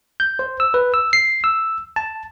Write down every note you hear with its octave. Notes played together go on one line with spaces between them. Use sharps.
G6
C5
E6
B4
E6
C7
E6
A5